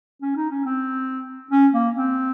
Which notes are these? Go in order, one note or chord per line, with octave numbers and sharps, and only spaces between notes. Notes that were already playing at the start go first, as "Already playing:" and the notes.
C#4
D#4
C#4
C4
C#4
A#3
C4